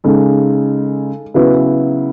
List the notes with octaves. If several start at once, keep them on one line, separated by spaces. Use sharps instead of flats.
C#3 G#3 D#4 A4
C#3 F#3 B3 E4 B4